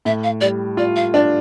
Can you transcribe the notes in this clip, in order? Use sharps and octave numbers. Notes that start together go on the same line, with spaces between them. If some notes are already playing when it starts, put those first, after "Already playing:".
A2 E5
F5
G3 D5
F4 D5
F5
D4 D5